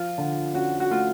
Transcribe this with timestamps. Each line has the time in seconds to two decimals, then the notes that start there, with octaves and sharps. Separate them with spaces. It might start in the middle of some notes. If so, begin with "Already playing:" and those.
Already playing: F3 F4
0.18 D3
0.54 C#4 F#4
0.80 F#4
0.90 A3 F4